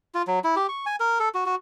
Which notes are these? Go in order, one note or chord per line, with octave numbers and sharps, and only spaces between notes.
F4
F#3
E4
G4
C#6
G#5
A#4
A4
F#4
F#4